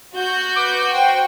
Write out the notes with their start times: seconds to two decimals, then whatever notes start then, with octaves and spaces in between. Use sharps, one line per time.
0.17 F#4 G6
0.56 B4 C#6 D6
0.93 C5 F#5 G5